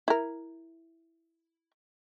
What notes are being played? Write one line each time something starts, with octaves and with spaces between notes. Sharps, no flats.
E4 A#4